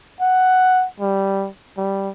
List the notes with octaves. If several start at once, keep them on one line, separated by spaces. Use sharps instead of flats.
F#5
G3
G3